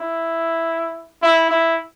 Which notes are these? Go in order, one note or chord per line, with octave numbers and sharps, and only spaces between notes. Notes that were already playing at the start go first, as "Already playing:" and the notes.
Already playing: E4
E4
E4